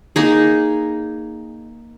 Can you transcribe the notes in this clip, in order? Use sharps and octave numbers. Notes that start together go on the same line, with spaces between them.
A#3 D#4 G#4